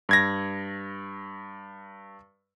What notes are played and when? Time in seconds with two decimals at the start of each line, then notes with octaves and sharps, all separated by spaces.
0.09 G2 G#6 A#6